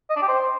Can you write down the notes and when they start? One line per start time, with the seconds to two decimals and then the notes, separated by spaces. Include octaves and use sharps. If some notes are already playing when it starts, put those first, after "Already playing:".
0.10 D#5
0.16 D4
0.22 G4
0.28 C5